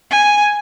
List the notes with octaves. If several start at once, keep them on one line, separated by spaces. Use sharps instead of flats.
G#5